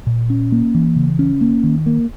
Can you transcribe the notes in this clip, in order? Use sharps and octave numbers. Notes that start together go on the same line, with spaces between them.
A#2
C#4
A#3
E3
C#3
C#4
A#3
D#3
A#3